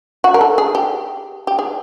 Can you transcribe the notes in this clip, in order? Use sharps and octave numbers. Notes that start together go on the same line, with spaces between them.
F#4
A#4
A4
G#4
G4
G4
G#4